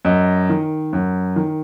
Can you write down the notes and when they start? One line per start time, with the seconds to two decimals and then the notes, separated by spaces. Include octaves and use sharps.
0.05 F#2 D#5
0.50 D#3
0.93 F#2
1.36 D#3